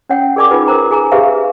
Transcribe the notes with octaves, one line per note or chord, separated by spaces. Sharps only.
C#4 C#5 F#5 G5
G#4 A#4 D5 G#5 D6
D#4 F4 G#4 B4 D6
A#4 C5 A#5
G#4 G#5 A#5
G4 G#4 B4 C5 E5 F5